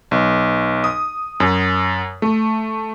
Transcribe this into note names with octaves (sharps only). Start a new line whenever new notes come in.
B1
D#6
F#2
A3